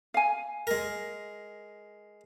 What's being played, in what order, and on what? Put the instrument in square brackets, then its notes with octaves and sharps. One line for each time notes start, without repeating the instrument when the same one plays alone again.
[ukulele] F5 G#5
[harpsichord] G#3 A#4